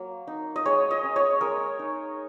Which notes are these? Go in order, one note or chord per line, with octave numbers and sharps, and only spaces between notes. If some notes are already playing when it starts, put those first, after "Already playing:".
Already playing: F#3 A#3
D#4
D#5
G#3 C#5
D#5
C#4
C#5
G#3 A#4
D#4